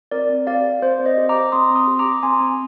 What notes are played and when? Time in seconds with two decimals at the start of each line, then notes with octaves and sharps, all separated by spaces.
0.11 C4 A#4 D5
0.29 C4
0.47 G4 D5 F5
0.64 G4
0.82 C4 C5
1.00 C4
1.06 C5 D#5
1.17 G4
1.29 A#5 D6
1.35 G4
1.52 C4 C6 D#6
1.70 C4
1.76 C6 D#6
1.87 G4
1.99 A#5 D6
2.05 G4
2.23 C4 G#5 C6
2.40 C4